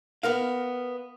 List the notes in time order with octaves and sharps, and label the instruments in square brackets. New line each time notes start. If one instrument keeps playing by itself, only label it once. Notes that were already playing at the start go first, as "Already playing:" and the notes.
[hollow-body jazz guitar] B3 A#4 F5